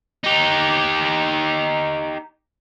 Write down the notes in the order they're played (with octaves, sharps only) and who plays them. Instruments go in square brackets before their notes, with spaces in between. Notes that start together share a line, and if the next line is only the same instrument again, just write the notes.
[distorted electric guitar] D#4 G4